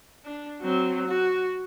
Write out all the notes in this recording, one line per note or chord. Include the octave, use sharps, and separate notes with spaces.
D4
F#3 C4
F#4